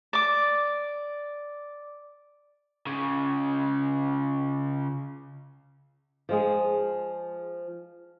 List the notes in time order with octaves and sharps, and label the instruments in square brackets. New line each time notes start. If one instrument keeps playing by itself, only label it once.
[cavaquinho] D5 D6
[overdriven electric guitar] C#2 C#3
[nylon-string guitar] F3 G#3 G#4